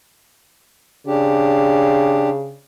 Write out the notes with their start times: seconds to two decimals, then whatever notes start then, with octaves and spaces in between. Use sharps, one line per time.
1.07 C#3 D4 G4